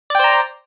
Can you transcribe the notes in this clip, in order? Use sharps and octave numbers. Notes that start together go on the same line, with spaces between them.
C5 D5 G5 A#5